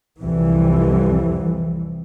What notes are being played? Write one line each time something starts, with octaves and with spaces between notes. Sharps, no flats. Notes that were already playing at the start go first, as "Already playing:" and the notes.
C2 F2 E3 G3